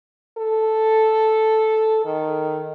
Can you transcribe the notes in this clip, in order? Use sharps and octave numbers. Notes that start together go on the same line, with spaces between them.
A4
D#3